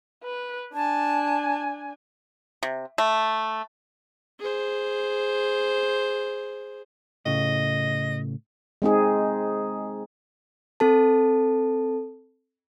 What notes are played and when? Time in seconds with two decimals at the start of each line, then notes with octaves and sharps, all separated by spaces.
0.23 B4
0.74 D4 G#5 A5
2.63 C3
2.98 A3
4.40 G#4 C5
7.26 A2 C#3 D#5
8.82 G#3 C4 D#4 G#4
10.80 C4 A4 A5